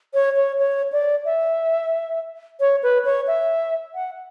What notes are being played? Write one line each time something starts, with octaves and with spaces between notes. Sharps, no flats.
C#5
C#5
C#5
D5
E5
C#5
B4
C#5
E5
F#5